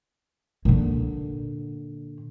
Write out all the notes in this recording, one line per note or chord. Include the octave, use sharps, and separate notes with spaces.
A#2 D3